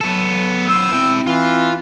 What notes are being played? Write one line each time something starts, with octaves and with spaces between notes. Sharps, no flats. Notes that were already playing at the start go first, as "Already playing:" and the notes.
F#3 B3 A4
B3 C5 E6
C4 E4 G5
E3 F4